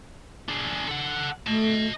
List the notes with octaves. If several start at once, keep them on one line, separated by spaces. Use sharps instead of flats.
D4 G#4
A4 F#5
A3 D#5 A5